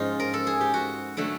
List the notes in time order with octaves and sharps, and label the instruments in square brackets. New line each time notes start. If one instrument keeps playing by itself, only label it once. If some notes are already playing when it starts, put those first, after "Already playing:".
Already playing: [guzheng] G#2 F3 G#3 C#4 D#4 F4
A#4
A4
G#4
G4
F#4
D3 F#3 A3